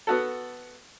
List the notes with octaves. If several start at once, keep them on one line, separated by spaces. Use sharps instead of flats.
B3 F#4 A4